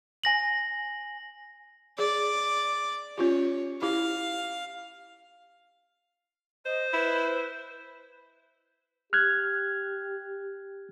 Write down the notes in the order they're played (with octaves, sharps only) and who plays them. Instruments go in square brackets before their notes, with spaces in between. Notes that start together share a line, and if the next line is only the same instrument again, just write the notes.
[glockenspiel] G#5 A#6 F#7
[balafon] G#4 [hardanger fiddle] D5
[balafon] C#4 F4 G4 [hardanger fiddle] C#5
[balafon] E4 G4 [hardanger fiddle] F5
[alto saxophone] C5 [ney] D#5
[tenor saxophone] E4 [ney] B4
[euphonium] G4 [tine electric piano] F6 F#6 G#6